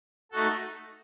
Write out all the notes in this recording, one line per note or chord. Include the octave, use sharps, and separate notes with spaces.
A3 D#4 F#4 A4